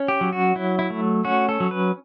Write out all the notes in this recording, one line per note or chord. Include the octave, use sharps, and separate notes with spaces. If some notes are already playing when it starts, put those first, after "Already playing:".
Already playing: C#4
G4
F#3
F#4
F#3 E4
E4
A3
C#4 F#4
A4
F#3
B4